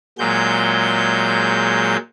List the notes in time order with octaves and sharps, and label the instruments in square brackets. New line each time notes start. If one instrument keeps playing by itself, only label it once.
[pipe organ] A#2 F#3 G#3 G6